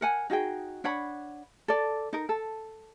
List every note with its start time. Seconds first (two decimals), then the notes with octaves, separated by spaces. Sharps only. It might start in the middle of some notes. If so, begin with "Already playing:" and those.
0.01 A#4 F#5 G#5
0.30 D#4 F#4 G#4 G5
0.84 D4 C#5 F#5 B5
1.68 A4 D5
2.13 D#4 A#4
2.29 A4